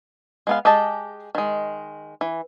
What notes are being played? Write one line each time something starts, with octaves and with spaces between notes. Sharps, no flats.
G#3 B3 F5
G#3 G4 G#4 D#5 A5
D#3 G#3
E3